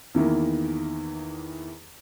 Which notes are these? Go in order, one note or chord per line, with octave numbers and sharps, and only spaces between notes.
E2 D#3 E3 A#3